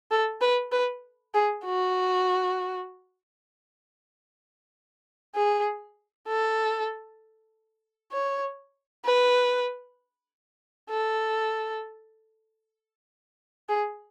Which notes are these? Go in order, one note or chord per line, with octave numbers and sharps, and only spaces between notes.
A4
B4
B4
G#4
F#4
G#4
A4
C#5
B4
A4
G#4